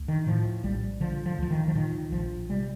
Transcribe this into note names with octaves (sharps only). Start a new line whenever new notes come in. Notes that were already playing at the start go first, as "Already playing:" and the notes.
Already playing: D2
D#3
A2 F3
A#1 G3
D3 F3
F3
D2 F3
D#3
F3
A#2 D#3
A#1 F3
C3 G3